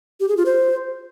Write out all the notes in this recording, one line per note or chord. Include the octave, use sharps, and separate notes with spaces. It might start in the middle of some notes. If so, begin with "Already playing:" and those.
G4
G#4
F4
C5